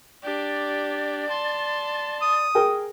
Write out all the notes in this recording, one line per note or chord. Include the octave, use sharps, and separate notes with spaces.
D4 G4 D5
A5 C6
D#6
G#4 A#4 G5